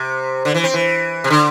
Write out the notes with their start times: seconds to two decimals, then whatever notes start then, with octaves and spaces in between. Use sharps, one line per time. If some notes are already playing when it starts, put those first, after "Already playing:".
Already playing: C3
0.45 D3
0.54 E3
0.64 C4
0.74 E3
1.24 C3
1.30 D3